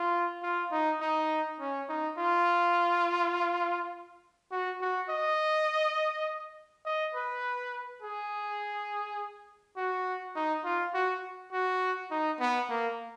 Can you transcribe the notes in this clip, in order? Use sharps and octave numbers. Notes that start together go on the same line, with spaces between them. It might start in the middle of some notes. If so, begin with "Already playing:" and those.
Already playing: F4
F4
D#4
D#4
C#4
D#4
F4
F#4
F#4
D#5
D#5
B4
G#4
F#4
D#4
F4
F#4
F#4
D#4
B3
A#3